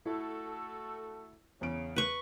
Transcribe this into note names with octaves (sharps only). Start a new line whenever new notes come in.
A3 E4 F#4 A4
E2 C#3 D7
B4 C#6